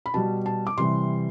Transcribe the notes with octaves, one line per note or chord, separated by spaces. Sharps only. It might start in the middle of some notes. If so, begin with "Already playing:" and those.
B5
B2 G3 A5
A5
D6
C3 E3 G3 C6